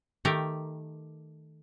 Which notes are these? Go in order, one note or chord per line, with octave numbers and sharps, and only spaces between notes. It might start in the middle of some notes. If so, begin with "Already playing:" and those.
D#3 A3 G4 A#4